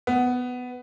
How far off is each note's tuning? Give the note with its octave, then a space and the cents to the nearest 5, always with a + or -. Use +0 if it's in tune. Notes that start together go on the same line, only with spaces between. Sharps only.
B3 +10